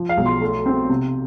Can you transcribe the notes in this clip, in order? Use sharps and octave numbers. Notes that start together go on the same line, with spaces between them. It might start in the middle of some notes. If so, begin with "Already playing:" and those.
Already playing: F3
F5
B1
C6
A3
C4
C3